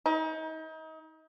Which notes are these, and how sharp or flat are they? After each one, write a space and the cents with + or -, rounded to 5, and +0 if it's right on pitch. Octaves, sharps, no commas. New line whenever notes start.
D#4 +35